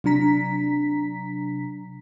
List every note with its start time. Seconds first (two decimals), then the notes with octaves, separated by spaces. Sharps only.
0.04 C3 F#3 D4 A#5 B6